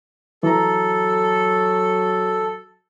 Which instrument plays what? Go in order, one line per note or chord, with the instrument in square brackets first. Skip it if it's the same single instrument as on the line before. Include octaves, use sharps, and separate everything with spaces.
[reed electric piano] E3 A#5 [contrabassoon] F#3 [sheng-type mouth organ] A4